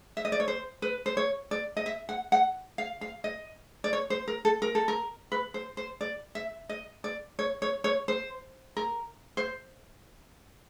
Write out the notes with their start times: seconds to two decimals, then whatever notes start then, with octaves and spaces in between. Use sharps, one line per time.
0.17 E5
0.25 D#5
0.32 D5
0.40 C#5
0.48 C5
0.82 B4
1.06 C5
1.17 C#5
1.51 D5
1.77 D#5
1.86 E5
2.09 F#5
2.32 F#5
2.78 F5
3.01 F5
3.24 D#5
3.84 D5
3.93 C#5
4.10 C5
4.28 A#4
4.45 A4
4.62 A#4
4.75 A4
4.88 A#4
5.32 B4
5.54 C5
5.77 C5
6.01 D5
6.35 E5
6.69 D#5
7.04 D5
7.39 C#5
7.62 C#5
7.84 C#5
8.08 C5
8.77 A#4
9.37 C5